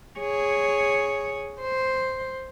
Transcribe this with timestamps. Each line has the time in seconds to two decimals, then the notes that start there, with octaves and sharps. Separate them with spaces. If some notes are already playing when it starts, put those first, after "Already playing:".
0.19 G#4 C#5
1.61 C5